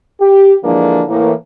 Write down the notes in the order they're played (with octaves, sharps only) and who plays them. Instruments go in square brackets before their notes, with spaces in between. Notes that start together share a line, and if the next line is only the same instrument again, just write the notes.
[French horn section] G4
D3 E3 F3 G#3 A#3 D4
A2 E3 A#3